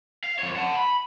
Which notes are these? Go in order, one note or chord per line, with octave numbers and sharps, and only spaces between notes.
F5
F2 C#5
F#5 A5
B5